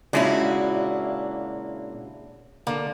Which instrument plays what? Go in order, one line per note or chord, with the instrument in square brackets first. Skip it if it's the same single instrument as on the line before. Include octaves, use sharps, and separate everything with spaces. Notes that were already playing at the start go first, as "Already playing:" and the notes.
[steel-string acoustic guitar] A#2 A#3 F#4 [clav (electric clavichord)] C#3 G#3 [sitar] D4 E4
[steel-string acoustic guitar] D3 [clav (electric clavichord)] A#3